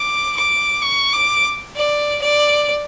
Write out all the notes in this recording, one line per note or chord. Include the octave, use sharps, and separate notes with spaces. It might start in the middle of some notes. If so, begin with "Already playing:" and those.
Already playing: D6
D6
C#6
D6
D5
D5